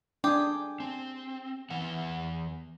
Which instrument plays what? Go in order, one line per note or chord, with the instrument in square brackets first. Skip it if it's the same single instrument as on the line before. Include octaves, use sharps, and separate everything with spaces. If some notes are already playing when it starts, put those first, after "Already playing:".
[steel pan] D4 C6 D#6 [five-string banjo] G4 G#4
[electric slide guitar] C4 [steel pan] G#5 A5
[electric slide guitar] E3 B3 F#5